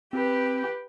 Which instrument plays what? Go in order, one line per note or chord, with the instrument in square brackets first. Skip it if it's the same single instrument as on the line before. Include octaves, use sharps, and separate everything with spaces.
[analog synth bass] C4 [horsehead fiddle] G4 B4